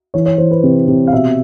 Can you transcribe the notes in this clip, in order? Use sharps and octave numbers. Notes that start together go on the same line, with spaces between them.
E3 C#5
C#5
E3 C5
B4
C3
C3
F5
B2 E5